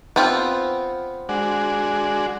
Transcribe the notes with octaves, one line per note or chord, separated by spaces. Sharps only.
B3 C4 F4
G#3 D4 F#4